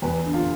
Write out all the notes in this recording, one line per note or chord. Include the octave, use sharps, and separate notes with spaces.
E2 B4
D3
F4